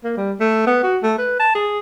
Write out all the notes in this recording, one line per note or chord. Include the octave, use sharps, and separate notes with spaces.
A#3
G3
A3
B3
F#4
A3
B4
A5
G#4